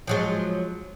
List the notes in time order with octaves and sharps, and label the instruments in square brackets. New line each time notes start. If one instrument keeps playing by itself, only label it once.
[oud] F3 F#3 G#3